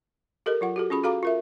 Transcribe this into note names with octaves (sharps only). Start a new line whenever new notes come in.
G4 A4 A#4 D#5
F#3 F4 F#5
F#4 G4 A4
C#4 F4 G#4 B5
F#4 A4 F5 A#5 D6
F4 A#4 E5